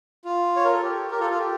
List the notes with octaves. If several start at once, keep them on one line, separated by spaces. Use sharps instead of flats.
F4
C#5
A#4
A4
G4
G4 A#4
F4 A4
F4
G4